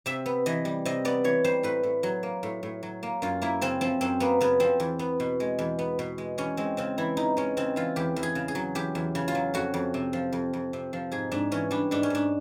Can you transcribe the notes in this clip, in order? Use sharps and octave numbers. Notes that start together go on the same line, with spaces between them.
C3 E5
B3
E3 D#5
G3
C3 D#5
B3 D5
E3 C#5
G3 C5
A2 B4
A2
F#3
A#3
A2
A2
F#3
A#3
F#2 F4
A#3 E4
C#3 C4
F3 C4
F#2 C4
A#3 B3
C#3 B3
F3 C4
E2
B3
B2
G#3
E2
B3
B2
G#3
E2 C#4
G#3 C4
C#3 C4
E3 E4
E2 D#4
G#3 C#4
C#3 C4
E3 F4
E2 G4
E2
G#4
C#3
G#4
F#3
E2 G4
E2
C#3
F4
F#3
F2 F#4
F2
C3
F3
F2
F2
C3
F3
G#2 G#4
G#2 D4
E3 C#4
G3 D4
G#2 D4
C#4
G#2 D4